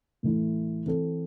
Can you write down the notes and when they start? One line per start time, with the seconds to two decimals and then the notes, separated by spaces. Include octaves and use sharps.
0.23 A2 E3 A3 E4
0.86 E3 C4 A4